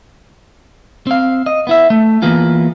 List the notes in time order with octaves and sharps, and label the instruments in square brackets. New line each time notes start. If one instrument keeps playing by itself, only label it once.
[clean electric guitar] C4 F5
D#5
B3 E4 E5
A3
E3 A#3 B3 F4 G#4